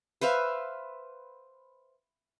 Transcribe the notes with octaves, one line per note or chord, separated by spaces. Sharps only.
B4 C5 E5 F5